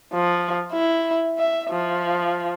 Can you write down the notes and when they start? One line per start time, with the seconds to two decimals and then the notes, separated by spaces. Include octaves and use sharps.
0.13 F3
0.72 E4
1.38 E5
1.70 F3